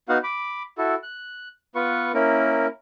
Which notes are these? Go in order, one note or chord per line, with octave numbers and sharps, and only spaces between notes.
B3 D#4 F#4 F5 F#5
B5 D6
E4 F#4 A4
F#6
B3 F4 B4 C#6
A#3 C#4 E4 A#4